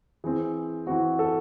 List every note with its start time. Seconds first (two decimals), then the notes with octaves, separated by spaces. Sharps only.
0.24 E3 C4 G#4
0.87 E3 C4 F#4
1.19 A4